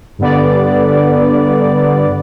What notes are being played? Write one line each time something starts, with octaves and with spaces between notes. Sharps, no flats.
G2 D3 B3 D5